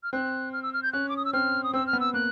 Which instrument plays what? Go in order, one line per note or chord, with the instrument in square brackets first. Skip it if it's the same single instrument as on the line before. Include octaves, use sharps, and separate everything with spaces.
[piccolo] F6
[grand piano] C4 [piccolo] F#6
[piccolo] F6
E6
F6
G6
[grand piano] C#4 [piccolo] F#6
[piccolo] D6
D#6
E6
[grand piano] C4 [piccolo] F6
[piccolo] D#6
[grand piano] C4 [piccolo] E6
[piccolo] F6
[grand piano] B3
[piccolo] E6
[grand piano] A#3 [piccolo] F#6